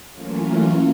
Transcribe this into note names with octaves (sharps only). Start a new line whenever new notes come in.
E3 F#3 A3 A#3 C#4 F4